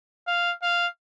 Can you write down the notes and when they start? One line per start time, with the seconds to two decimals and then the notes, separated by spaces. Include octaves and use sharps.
0.27 F5
0.62 F5